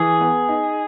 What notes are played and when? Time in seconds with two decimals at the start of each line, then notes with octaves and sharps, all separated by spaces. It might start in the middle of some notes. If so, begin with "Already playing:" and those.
Already playing: E3 G#4
0.21 B3
0.49 D#4